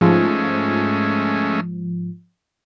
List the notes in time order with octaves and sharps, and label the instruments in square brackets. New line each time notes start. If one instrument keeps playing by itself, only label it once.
[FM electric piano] G#2 F3 [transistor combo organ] G#3 A3 C#4